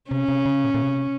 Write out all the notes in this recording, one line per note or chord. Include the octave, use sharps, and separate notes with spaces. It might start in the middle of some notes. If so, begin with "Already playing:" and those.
C3 C#4
C3
C#3
A#2
A#2
C3